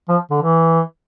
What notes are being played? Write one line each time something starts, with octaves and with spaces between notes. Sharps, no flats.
F3
D3
E3